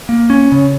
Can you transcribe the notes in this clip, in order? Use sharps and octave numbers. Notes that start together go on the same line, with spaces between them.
A#3
C#4
C#3